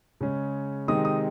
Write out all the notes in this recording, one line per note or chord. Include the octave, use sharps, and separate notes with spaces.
C#3 G#3 C#4
C3 D#3 G#3 C4 D#4 D#6
D#6